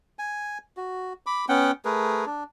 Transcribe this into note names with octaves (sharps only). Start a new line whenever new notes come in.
G#5
F#4
B5 D6
B3 C#4 F#5 G5
A3 G#4 A#4 B4
D4